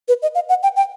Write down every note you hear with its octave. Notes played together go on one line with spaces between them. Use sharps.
B4
D#5
F5
F#5
G5
G5